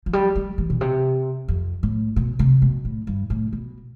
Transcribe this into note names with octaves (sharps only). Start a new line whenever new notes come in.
F3
G3
G3
E3
B2
C3
F2
A2
B2
C3
B2
A2
G2
A2
B2